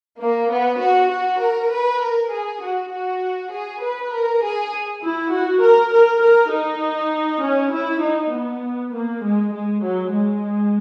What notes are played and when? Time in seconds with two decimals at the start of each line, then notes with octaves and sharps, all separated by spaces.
0.19 A#3
0.50 B3
0.79 F#4
1.10 F#4
1.41 A#4
1.70 B4
2.00 A#4
2.31 G#4
2.60 F#4
2.91 F#4
3.52 G#4
3.81 B4
4.12 A#4
4.42 G#4
5.02 E4
5.32 F#4
5.61 A#4
5.92 A#4
6.22 A#4
6.52 D#4
7.42 C#4
7.72 E4
8.02 D#4
8.33 B3
8.93 A#3
9.23 G#3
9.53 G#3
9.83 F#3
10.13 G#3